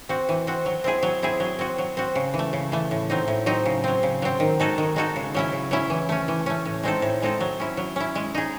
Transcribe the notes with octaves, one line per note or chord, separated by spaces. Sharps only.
C4 F#4
E3
C4 F#4
F#3
C4 E4 G#4
F#3
C4 E4 G#4
F#3
C4 F#4
F#3
C4 F#4
C#3
E3
A3
C#3
E3 A3
A2
F#3 C4 D#4
A2
F#3 C4 D#4
C#3
F#3 C4
C#3
F#3 C4
D#3
G#3 D#4 F#4 A4
D#3
G#3 D#4 F#4 A4
C#3
F#3 C#4 E4
C#3
F#3 C#4 E4
E3
A3 C#4
E3
A3 C#4
A2
G#3 C4 D#4 A4
A2
G#3 C4 D#4 A4
F#3
C#4 E4
F#3
C#4 E4
G#3
D#4 G#4